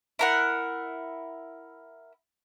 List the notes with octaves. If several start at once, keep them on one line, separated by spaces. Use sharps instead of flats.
E4 A#4 F#5